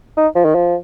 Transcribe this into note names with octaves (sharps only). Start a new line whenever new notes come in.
D#4
F3
D#3
F3